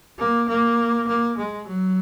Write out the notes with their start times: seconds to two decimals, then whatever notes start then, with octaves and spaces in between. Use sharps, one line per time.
0.19 A#3
0.48 A#3
1.08 A#3
1.38 G#3
1.67 F#3